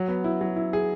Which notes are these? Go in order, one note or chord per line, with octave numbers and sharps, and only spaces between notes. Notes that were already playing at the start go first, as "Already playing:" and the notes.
Already playing: F#3
B3
E4
F#3
E4
G#4